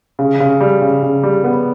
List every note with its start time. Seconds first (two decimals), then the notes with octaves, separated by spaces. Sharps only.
0.19 C#3
0.40 C#3
0.60 G3
0.82 C#3
1.03 C#3
1.23 G3
1.44 B3